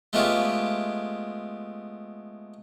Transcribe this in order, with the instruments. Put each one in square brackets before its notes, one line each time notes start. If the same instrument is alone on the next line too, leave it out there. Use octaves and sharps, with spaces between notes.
[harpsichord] G#3 A3 B3 F4 G4 C#5